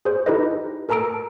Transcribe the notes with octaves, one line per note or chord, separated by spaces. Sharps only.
G#4 C5
D#4 E4 G4 A4 B4 D#5
A4 A#4 A5 A#5 E6 D7